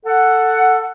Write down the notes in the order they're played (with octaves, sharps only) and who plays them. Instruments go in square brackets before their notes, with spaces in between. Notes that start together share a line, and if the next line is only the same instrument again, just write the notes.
[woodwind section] A4 F#5